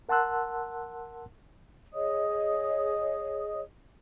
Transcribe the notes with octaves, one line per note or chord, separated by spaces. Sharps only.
A#4 F#5 A5 C6 E6 F#6
G#4 C#5 D#5 D#6